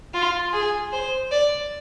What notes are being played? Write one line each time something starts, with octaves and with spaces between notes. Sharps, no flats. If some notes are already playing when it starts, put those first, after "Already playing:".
F4
G#4
C5
D5